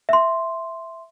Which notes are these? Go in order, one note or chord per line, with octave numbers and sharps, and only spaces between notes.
E5 C6